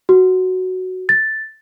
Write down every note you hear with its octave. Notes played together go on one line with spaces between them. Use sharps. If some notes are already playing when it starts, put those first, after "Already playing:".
F#4
A6